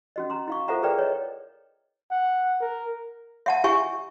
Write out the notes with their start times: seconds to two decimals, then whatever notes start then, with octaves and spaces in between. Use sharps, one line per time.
0.16 C#4 F#4 D#5
0.30 A#5 C6
0.48 E4 F5 C#6
0.68 F4 A4 C5 E5 F#5 A#5
0.83 G#4 A#4 B4 D5 G5
0.98 C#5 D#5
2.11 F#5
2.61 A#4
3.46 E5 F#5 A5
3.64 E4 G4 E5 G#5 C#6